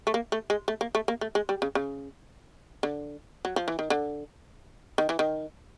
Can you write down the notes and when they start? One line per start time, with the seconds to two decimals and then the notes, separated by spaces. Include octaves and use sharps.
0.07 A3
0.14 A#3
0.32 A3
0.50 G#3
0.68 A3
0.81 A#3
0.95 A3
1.08 A#3
1.21 A3
1.35 G#3
1.49 G3
1.62 C#3
1.75 C#3
2.83 D3
3.45 F#3
3.56 F3
3.68 E3
3.79 D#3
3.90 D3
4.98 D#3
5.09 E3
5.19 D#3